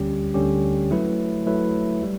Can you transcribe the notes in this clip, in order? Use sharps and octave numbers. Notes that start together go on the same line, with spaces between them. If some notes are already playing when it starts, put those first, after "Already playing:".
Already playing: D2 D3 G3 C#4 G4
D2 D3 G3 C#4 G4
F#3 A3 E4 B4
F#3 A3 E4 B4
G3